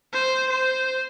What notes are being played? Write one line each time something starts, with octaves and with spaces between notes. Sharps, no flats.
C5
C5